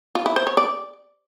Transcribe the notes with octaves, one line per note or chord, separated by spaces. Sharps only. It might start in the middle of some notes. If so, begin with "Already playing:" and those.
F4
E4
C5
C#5
D5